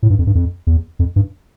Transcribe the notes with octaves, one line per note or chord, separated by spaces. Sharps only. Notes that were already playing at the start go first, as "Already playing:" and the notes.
A2
G2
F2
G2
F2
E2
F2
G2